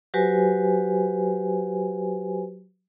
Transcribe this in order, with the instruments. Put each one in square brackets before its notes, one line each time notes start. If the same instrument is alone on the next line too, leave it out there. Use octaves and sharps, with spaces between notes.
[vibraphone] F#3 F#4 G4 B4 C5 G#5